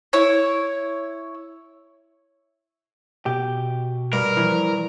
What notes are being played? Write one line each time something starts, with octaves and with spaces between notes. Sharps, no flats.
E4 C#5
B2 G4
G2 A#4
E3 F3